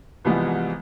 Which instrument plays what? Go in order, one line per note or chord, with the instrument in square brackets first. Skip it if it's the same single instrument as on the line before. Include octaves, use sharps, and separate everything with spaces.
[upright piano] C2 E3 F3 G3 G#3 B3